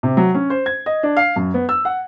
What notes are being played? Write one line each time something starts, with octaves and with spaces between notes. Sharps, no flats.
C3
F#3
C#4
C5
G#6
D#5
D4
F5
F#2
B3
E6
F#5